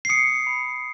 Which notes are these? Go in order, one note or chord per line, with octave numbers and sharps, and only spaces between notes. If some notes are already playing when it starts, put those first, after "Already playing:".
C7
D#6 C#7
B5